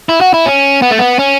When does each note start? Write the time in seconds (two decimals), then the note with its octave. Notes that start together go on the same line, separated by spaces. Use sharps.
0.09 E4
0.21 F#4
0.34 E4
0.46 C#4
0.82 B3
0.91 A3
0.99 B3
1.19 C#4